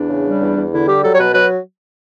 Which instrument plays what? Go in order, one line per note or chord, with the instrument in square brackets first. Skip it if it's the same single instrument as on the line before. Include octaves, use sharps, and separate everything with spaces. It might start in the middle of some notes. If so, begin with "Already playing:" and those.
Already playing: [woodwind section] E2 D4
C#3
G3
E2
E2
D3 E4
G3 G4
F#3 A4
C#5
B2 B4
F#3 B4